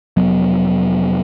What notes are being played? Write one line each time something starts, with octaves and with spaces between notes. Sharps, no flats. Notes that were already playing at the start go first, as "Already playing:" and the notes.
F1 F#3 B3